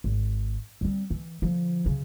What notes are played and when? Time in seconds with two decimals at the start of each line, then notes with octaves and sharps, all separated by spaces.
0.04 G#1
0.81 G3 C4
1.10 E3
1.42 D3 F3
1.86 F#2 C#3